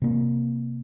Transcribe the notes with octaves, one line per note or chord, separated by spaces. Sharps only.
C3 A#3